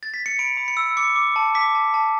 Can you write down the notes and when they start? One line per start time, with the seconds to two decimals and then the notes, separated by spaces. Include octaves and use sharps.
0.03 A6
0.14 B6
0.26 C#7
0.39 B5 D7
0.57 B5
0.68 C#7
0.77 E6
0.97 D6 C#7
1.16 D6
1.36 A5
1.55 D6 B6
1.75 A5
1.94 A5